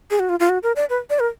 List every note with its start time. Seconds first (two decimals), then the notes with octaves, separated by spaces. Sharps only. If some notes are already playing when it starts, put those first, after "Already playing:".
0.11 G#4
0.20 F#4
0.29 F4
0.40 F4
0.49 F#4
0.63 A#4
0.76 D5
0.90 B4
1.10 D5
1.20 A#4